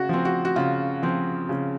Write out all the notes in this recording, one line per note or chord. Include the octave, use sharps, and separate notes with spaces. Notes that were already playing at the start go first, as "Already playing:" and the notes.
Already playing: C#3 F#4
F3 C4
F#4
F#4
C#3 F4
F3 C4
C#3